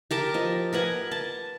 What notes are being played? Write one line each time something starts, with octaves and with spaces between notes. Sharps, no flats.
G4 A#4 A5
F3 D#5
A#4 B4 F#5 G#5
A5